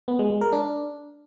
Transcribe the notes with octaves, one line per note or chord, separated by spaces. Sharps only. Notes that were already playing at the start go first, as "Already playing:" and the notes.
B3
G#3
G#3
A#4
D4